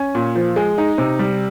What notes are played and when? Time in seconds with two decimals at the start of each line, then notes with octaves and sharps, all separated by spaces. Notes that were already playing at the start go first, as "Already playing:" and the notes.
Already playing: C#4
0.15 A#2
0.35 F3
0.56 G#3
0.78 D#4
0.98 C3
1.19 G3